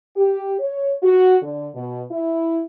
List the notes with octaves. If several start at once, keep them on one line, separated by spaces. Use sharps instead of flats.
G4
C#5
F#4
D3
B2
E4